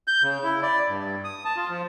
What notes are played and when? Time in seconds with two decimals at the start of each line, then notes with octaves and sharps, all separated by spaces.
0.08 G6
0.23 C#3
0.43 E4
0.62 D5
0.89 G2
1.24 D#6
1.45 A5
1.57 F4
1.69 F3